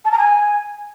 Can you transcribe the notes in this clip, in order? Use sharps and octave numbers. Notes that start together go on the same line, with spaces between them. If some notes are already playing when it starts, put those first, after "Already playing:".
A5
A#5
G#5